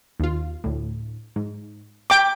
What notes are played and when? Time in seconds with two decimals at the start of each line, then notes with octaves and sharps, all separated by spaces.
0.20 D#2 F4
0.64 D2 A2
1.36 G#2
2.10 G5 A#5 D6 B6